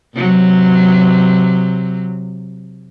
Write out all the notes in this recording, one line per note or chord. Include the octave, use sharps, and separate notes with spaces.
C3 F#3